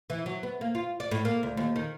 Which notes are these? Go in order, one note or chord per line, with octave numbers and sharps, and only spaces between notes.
E3
F#3
B3
A#3
F4
D5
A2
A#3
D2
D#2
D#3